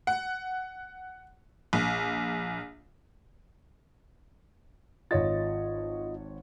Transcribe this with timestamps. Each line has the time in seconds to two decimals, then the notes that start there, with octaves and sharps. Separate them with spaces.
0.07 F#5
1.73 A#1
5.11 G#1 F4 C#5 D#5 A6